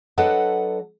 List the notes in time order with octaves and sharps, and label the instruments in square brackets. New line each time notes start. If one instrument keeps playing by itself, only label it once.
[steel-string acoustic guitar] F#3 D4 A4 B4 D#5 F#5